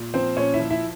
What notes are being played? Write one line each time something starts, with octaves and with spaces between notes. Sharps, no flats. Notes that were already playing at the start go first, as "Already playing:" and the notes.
Already playing: A#2
F3 C4 C5
A#2 C#4 C#5
E4 E5
F3
E4 E5